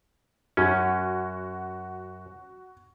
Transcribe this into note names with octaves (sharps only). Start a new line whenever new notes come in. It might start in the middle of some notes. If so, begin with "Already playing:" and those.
F#2 C#4 F#4